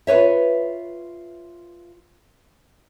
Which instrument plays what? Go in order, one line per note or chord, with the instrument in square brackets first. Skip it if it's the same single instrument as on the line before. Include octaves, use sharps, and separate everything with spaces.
[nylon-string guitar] F4 B4 C#5 E5